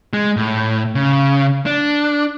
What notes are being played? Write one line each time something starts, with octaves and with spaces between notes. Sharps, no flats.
G#3
A2
C#3
D4